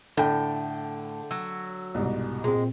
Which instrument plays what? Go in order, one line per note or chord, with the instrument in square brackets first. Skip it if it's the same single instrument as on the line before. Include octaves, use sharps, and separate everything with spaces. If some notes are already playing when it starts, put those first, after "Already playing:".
[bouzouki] A2 [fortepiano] D3 G5
[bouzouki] F#3 [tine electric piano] E6
[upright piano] C2 G#2 B2
[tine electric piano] A#2 C4 [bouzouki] G#3